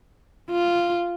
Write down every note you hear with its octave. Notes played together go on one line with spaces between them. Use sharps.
F4